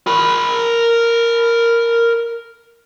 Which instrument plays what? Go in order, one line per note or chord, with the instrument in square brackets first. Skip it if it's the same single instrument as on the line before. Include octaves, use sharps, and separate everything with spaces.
[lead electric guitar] A#4 B5